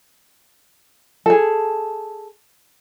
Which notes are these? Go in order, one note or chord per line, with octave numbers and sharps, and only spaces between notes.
G#4 A4